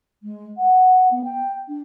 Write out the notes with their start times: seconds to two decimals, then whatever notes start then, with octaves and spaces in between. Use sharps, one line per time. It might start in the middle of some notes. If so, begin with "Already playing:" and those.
0.22 G#3
0.57 F#5
1.10 B3
1.24 G5
1.67 D4